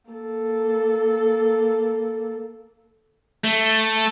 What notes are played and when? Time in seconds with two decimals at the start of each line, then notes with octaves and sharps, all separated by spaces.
0.10 A#3 A4
3.44 A3